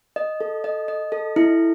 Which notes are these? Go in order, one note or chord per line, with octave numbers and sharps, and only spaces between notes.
D#5
A4
D#5
D#5
A4
E4